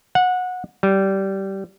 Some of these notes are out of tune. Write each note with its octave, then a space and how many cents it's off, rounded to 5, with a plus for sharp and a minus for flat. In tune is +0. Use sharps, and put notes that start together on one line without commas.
F#5 -20
G3 -15